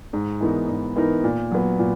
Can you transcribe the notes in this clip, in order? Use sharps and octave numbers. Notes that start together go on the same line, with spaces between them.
G#2
E3 B3 D#4 A#4
G#2
E3 B3 D#4 A#4
A#2
F#3 B3
A#2